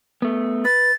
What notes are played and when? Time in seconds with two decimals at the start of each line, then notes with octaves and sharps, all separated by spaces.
0.22 A3 B3
0.65 B4 A6